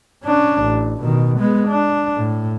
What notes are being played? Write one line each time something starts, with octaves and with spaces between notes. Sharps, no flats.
C#4 D4
A1
B2 D#3
G#3 B3
D4
A2